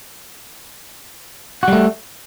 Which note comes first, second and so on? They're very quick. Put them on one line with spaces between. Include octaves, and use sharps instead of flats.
F#4 G3 A3